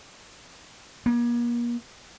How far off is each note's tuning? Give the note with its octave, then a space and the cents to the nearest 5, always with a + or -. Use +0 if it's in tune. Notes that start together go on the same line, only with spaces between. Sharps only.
A#3 +40